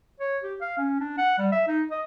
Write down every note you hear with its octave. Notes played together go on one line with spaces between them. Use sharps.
C#5
G4
F5
C#4
D4
F#5
G3
E5
D#4
D#5